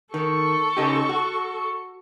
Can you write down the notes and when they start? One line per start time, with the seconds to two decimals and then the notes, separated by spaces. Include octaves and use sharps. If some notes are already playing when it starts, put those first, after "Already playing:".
0.14 D#3 A4 C#6
0.77 C#3 D#4 G4
1.09 F#4